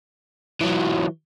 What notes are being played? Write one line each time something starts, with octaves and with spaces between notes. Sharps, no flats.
E3 F#3